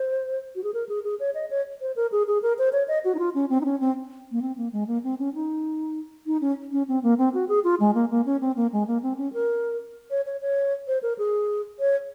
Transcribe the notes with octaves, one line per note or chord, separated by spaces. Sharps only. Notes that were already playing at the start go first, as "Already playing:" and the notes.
Already playing: C5
F#4
G#4
A#4
G#4
G#4
C#5
D#5
C#5
C5
A#4
G#4
G#4
A#4
C5
C#5
D#5
F#4
D#4
F4
C#4
C4
D#4
C#4
C4
A#3
C4
A#3
G#3
A#3
C4
C#4
D#4
D#4
C#4
C#4
C4
A#3
C4
F#4
G#4
F4
G#3
A#3
A#3
C#4
C4
A#3
G#3
A#3
C4
C#4
A#4
C#5
C#5
C#5
C5
A#4
G#4
C#5